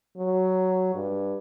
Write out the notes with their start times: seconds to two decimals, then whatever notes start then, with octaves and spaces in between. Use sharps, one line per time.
0.17 F#3
0.95 G2